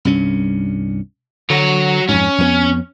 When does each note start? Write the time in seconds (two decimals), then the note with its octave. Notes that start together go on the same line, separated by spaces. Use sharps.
0.05 C2 G2 C#4
1.50 D3 F#3 C#5
2.09 F2 G#2 C#4
2.38 F2 G#3 B3